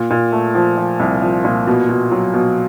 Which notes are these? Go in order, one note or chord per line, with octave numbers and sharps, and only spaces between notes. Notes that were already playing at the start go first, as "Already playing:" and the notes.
Already playing: A#2
A#2
A3
F3
F3
C2
F3
A#2
B2
B2
F#3
B2